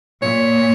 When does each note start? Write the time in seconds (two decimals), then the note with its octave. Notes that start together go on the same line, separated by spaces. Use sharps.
0.22 A#2 C#5